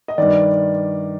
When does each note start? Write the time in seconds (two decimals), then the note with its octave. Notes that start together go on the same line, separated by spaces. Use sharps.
0.08 D#5
0.18 G2 D#3 D5